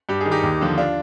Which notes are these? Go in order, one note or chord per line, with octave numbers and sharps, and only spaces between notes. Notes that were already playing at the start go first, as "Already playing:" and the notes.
G2 G4
G#4
D#3
D#4 G4
D#2
D3 F3
D4 F4